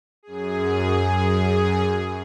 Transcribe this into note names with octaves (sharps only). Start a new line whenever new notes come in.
F#2 G#4